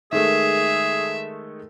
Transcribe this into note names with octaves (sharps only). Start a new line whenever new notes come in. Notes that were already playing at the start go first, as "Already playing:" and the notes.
D#3 G#3 A3 G#4 E5